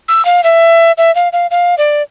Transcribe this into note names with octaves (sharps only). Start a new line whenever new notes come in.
E6
F5
E5
E5
F5
F5
F5
D5